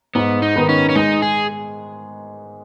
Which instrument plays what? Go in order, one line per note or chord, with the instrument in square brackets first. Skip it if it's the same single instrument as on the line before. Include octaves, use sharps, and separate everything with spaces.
[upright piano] G#2 [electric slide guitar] B3
[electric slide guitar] D#4
[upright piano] D#3 B3
[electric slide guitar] C#4
C#4
[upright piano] G#3 [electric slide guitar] D#4
[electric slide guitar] G#4